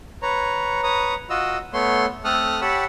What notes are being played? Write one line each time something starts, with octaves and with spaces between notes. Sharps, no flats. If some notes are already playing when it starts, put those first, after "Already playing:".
B4 C#5 A#5
B4 C#5 A#5 D#6
F4 F#4 D#5 E6
A3 B3 C#5 C6
A3 C4 A4 D#6 F6 F#6
G4 C#5 F#5 A5 B5 E6